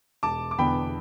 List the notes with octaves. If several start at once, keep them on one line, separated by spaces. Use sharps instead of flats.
E1 A5 D6
D6
E2 D3 B3 G5 B5